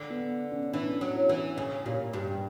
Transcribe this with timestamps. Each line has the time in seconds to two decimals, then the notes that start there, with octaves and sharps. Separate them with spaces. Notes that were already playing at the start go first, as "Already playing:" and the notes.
Already playing: D3
0.10 B3
0.52 C#4
0.73 E3 D4
1.01 F#3
1.15 E4
1.29 E3
1.58 C#3
1.86 A#2 G4
2.13 G2 G4